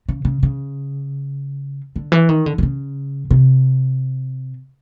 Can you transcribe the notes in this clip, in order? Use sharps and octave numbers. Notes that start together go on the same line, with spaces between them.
C#3
C#3
C#3
D3
E3
D#3
D3
D3
C#3
C3